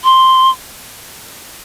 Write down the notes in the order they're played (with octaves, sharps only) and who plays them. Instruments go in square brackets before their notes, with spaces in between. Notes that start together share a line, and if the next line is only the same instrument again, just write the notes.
[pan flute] C6